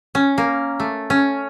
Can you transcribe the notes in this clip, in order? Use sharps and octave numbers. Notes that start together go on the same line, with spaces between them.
C#4
A#3
A3
C#4